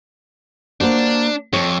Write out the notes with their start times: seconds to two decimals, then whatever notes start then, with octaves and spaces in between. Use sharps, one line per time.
0.81 A#3 D4 F#4 C5
1.53 F2 C#5